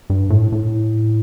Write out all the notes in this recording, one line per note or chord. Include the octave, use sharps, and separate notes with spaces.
G2
A2
A2